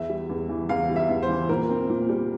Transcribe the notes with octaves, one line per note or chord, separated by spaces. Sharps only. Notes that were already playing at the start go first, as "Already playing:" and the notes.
Already playing: E2 E5
G3
E2
E3
E2 F5
G3
E5
E2
C5
E3
A#2 A#4
C4
A#2
G3